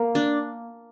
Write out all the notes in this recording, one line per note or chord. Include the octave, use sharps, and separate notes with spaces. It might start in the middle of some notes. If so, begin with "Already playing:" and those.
Already playing: A#3
D4